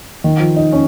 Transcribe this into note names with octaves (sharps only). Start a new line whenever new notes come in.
D#3
F3
D#4
C#4